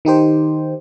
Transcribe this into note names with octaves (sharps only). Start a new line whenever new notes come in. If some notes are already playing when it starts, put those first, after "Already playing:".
D#3 D#4 G4 C5